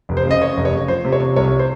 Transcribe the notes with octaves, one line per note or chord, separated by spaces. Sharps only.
F1
C5
C#3
D#5
C#3 C#5
F1
C#5
C#3
F3 C5
C3
C#5
C3
C2 C#5
C5